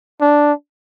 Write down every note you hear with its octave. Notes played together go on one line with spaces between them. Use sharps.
D4